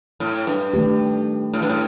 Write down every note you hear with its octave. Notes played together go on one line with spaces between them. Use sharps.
A2
G2
D#3 A3 D4 G4
A2
G2
A2